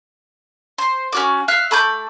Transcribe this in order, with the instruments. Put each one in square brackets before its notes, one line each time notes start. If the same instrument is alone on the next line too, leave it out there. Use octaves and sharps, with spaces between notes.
[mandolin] C5
C#4 F#4 D6
E5 F5 F#6
A3 B5 D6 G6